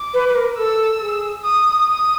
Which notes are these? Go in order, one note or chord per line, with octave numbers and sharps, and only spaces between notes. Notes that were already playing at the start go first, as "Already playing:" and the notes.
Already playing: D6
B4
B4
A#4
A4 E6
G#4
D#6
D#6